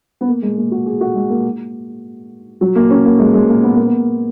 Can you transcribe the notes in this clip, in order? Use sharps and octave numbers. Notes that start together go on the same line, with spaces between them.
B3
A#3
G#3
A#3
F#4
G#4
F#4
G#3
A#3
F#3
A#3
C#4
A#3
G#3
G#3
A#3
B3
A#3
B3